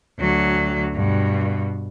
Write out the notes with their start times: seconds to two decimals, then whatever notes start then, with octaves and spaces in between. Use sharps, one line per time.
0.19 D2 F#3
0.94 G2 B2